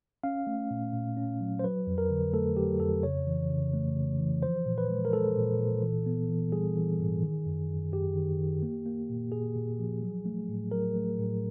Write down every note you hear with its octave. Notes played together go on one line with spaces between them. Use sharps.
C#4 F5
A3
A#2
A#2
C#4
F#3
C5
F#3 B4
F2
A#4
D3
A3 A4
F#3 G4
F2 A4
C#3 C#5
E3
C#3
A3
C#3
E3
F3 C5
A#2
B4
G#3
A#4
G#3 A4
A#2
A#2
E3
B3
E3
G3 G#4
E3
G#2
D#3
F#2
F#2
F#2 G4
D#3
D#3
A#3
A#3
A#2
A#2 G#4
A#2
F3
F#3
A3
A2
F#3 A#4
A3
A2